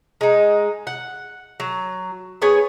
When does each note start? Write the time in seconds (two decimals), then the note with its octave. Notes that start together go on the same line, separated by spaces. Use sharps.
0.21 G#3 D#4
0.87 F#5
1.60 F#3
2.42 B3 G#4 C#5 G#5